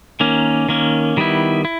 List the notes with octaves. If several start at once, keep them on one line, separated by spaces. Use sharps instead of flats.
D#3 A#3 C#4
D#3 A#3 C#4
D#3 G3 B3 E4
E4